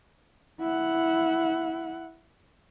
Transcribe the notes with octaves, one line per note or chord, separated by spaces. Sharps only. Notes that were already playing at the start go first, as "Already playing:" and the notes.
E4 F#5